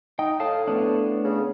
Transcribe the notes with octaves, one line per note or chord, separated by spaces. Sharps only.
D#4 G5
A2 F5 A5 D#6
A3 B3 D4
C#3